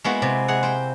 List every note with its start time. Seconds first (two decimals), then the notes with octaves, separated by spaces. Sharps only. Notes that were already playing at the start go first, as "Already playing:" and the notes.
0.04 G#3 A#3 B3 E4 F#4
0.22 C3
0.48 G#3 G#4 F#5
0.63 C5 G5